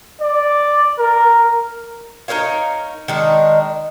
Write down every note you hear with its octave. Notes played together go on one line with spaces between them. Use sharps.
D5
A#4
D#4 A#4 C#5 F5
D#3 G#3 D4